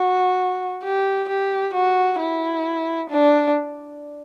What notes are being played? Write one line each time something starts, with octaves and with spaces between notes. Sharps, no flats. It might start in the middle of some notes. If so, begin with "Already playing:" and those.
Already playing: F#4
G4
G4
F#4
E4
D4